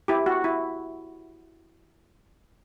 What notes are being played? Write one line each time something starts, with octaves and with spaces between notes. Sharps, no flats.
E4 G4
F#4
E4